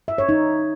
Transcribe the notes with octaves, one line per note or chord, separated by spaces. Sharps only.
E5
C#5
D#4